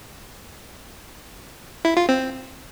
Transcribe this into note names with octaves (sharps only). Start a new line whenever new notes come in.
E4
F4
C4